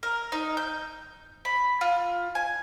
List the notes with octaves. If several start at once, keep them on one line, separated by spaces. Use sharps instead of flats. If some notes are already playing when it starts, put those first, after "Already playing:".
A#4
D#4
G6
B5
F4
G#5